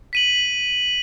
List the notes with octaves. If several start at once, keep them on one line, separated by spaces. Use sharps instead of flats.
B6 D#7 F#7